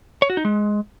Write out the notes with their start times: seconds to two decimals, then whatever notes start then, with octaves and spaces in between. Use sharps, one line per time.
0.22 C#5
0.30 F#4
0.37 D#4
0.45 G#3